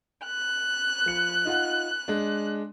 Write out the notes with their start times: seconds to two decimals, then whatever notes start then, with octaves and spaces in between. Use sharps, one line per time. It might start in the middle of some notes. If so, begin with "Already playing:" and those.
0.24 F#6
1.06 F3 C#7
1.45 D#4 F4 F#5
2.08 G#3 D4